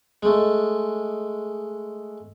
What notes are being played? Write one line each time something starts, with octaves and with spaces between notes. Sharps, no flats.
G#3 A3